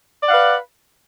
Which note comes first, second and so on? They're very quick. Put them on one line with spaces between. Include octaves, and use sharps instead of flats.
D5 F#5 F5 B4